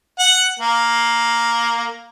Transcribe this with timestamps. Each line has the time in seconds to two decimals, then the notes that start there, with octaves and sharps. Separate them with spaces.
0.19 F#5
0.59 A#3